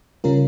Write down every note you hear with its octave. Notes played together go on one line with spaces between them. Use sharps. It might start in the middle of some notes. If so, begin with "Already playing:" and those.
C#3 G3 C#4 F4 A#4